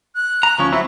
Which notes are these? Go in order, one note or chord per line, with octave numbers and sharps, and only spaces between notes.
F#6
A#5
D2 F3 C#4 C#6
F#3 C4 E4 E5